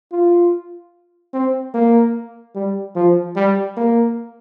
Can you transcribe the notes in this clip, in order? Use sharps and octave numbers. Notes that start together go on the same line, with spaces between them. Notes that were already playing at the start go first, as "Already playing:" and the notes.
F4
C4
A#3
G3
F3
G3
A#3